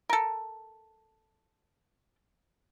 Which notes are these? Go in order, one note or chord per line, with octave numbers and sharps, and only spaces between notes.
A4 A#4